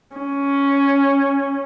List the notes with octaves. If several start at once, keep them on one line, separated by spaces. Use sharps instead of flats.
C#4